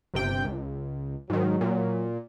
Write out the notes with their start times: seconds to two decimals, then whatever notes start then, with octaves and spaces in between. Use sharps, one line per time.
0.14 G1 C3 G5
0.44 C#2
1.30 G#2 D#3 F#3
1.61 A#2